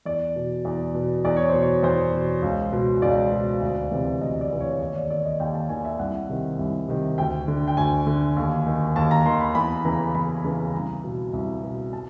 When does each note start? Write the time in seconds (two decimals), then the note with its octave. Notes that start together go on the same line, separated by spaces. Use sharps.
0.05 E2 D5
0.36 B2
0.65 E2
0.94 B2
1.25 E2 D5
1.37 C#5
1.50 B2 C5
1.62 C#5
1.83 E2 C5
2.13 B2
2.43 C#2
2.73 B2
3.02 C#2 D5
3.32 B2
3.62 D2
3.91 C3 E3
4.21 D2 D#5
4.41 D5
4.51 C3 E3
4.60 C#5
4.81 D#2 C#5
4.96 D5
5.10 D#3 D5
5.25 D#5
5.40 D#2 G5
5.55 A5
5.69 D#3 G#5
5.85 E5
5.99 C2 F#5
6.29 C3 D#3
6.59 C2
6.88 C3 D#3
7.18 D2 G5
7.48 D3
7.68 G5
7.77 D2 G#5
8.07 D3
8.37 D#2
8.67 D#3
8.96 D#2 A5
9.11 A#5
9.26 D#3 C6
9.41 B5
9.55 E2 B5
9.85 C#3 E3 A#5
10.15 E2 B5
10.44 C#3 E3
10.74 C2 A#5
11.04 B2
11.33 C2
11.63 B2
11.93 A5